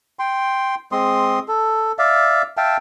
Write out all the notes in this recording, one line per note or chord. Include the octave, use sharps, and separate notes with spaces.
G5 C6
G#3 C4 C6 D#6
A4
D5 E5 F5
E5 F5 G5 A5